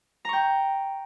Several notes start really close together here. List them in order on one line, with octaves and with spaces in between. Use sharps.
A#5 C#6 G5